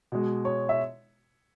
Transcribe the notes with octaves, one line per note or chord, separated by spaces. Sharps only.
B2 G#3
C#5
E5